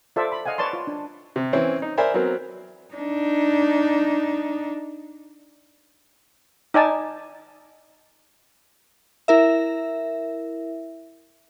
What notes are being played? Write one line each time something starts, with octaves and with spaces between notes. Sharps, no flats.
F4 A4 C5 D5 E5
B5
D#5 F5 F#5 G#5
B4 C#5 D5 A5 C6
F4
D4
C3
E3 C4 C#4 E4
D#4
A#4 C5 D5 E5 G#5 B5
F#3 B3 C4 A#4
D4 D#4
D#4 D5 G#5 A5
E4 A#4 E5